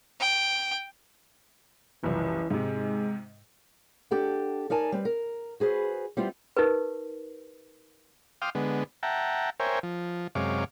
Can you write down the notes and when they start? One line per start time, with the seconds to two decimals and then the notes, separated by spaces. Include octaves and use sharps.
0.20 G5
2.03 F#1 C2 E3 F3
2.50 G#2 C3 G#3
4.11 D4 G4 A4 F#5
4.70 D#4 A#4 D5 G#5 A5
4.92 G3 C4 B4
5.05 A#4
5.60 F#4 G#4 B4 C5
6.17 G3 B3 C4 E4 F4
6.57 D#4 G4 A#4 B4
8.42 F5 G5 C6 D6 D#6 F6
8.55 D3 G#3 B3
9.03 E5 F#5 G5 A5 A#5
9.60 A#4 C5 C#5 E5 G5 G#5
9.83 F3
10.35 F#2 C3 G#3 C#5 F5 D6